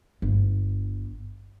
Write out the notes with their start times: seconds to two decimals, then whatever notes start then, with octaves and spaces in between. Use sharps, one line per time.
0.22 G1